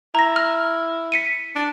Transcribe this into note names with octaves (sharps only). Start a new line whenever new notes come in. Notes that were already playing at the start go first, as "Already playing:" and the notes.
E4 A#5 A#6
F6
B6 C#7 D#7
D4